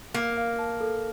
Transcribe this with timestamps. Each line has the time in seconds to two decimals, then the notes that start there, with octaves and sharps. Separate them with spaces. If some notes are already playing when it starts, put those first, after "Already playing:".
0.14 A#3 F5
0.37 F5
0.59 A5
0.81 A4